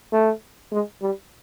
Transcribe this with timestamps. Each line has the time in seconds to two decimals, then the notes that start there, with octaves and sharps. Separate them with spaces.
0.13 A3
0.72 G#3
1.01 G3